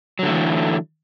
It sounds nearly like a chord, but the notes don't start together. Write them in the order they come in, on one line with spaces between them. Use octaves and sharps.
F#3 D3 A3 E3